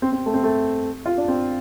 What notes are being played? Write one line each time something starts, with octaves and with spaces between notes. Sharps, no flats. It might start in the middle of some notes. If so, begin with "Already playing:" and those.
C4
C4
A3
C4
A3
F4
D4
C4